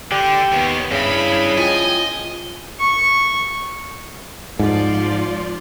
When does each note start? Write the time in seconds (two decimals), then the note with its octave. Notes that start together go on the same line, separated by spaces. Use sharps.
0.11 D3 G4
0.52 D#2 B3
0.91 G2 C#3 E4 B5
1.57 F3 D#5 G5 G#5
2.80 C#6
4.59 G#2 F3 D5 C6